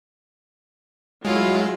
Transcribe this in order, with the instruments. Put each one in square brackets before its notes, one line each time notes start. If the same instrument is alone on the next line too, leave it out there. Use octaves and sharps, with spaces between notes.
[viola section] F#3 E4 [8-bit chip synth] G#3 [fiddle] F4